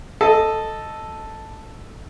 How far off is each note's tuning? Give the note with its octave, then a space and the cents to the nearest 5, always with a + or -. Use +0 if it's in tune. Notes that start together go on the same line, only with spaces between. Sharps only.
A4 +0 D#5 -5